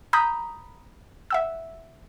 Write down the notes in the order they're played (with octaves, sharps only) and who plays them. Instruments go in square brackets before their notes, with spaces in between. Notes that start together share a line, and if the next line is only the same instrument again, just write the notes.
[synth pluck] A#5 B5 D#6 G6
E5 F#5 E6